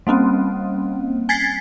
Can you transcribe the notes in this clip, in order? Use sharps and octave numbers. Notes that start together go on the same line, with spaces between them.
G3 A#3 C4 C#4
G#5 G#6 A6 B6 C7